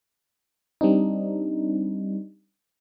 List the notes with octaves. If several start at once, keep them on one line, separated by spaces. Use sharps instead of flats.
G3 C4 D4 D#4